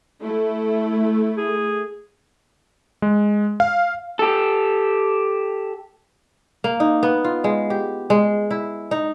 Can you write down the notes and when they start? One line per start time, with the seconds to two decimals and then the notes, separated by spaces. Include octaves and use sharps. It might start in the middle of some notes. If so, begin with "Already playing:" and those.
0.22 A3 E4
1.37 G#4
3.02 G#3
3.60 F5
4.19 G4 A4
6.64 A#3
6.80 D#4
7.03 B3
7.24 F4
7.44 G#3
7.70 G4
8.10 G#3
8.51 E4
8.91 D#4